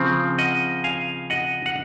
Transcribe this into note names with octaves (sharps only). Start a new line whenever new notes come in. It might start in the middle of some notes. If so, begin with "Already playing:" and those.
Already playing: C#3 F3 C4
D#5 F#5
F5 G#5
D#5 F#5
F#5